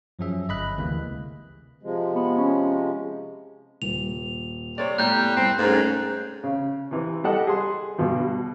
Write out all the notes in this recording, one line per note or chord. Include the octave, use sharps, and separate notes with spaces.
F#2 F3 F#3 C#4 G#4 E5
G1 D#5 B5 F#6
D2 C3 E3 G#3 A#3
C3 F3 G#3
B3
C#4
D#1 F7
C3 C#5 D5
A2 G3 A3 B3 A#5 F#6 G6
C2 C4
G#2 A3 C#4 G#4 A#4
C#3
C3 E3
G3 G4 A4 D#5 F#5
G#4 C6
G2 B2 D3